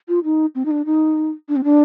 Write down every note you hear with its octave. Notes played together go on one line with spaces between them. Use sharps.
F4
D#4
C4
D#4
D4
D#4
D4
C4
D4